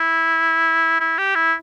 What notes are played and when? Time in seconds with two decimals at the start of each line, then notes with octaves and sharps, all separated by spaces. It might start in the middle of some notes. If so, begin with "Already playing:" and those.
Already playing: E4
1.00 E4
1.18 G4
1.35 E4